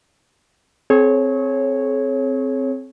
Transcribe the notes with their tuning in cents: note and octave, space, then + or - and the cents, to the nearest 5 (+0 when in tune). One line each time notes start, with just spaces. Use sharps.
C4 +0 G#4 +45 C#5 -10